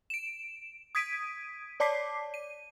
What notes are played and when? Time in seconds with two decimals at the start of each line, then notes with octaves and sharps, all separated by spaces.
0.10 D7 E7
0.95 D#6 G#6 B6 D7 D#7
1.80 C#5 D5 A5 D6 B6 C7
2.34 D#7